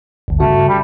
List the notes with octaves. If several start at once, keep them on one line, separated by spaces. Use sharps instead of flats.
G1 D2
G2 C#3 A3 F#4
G3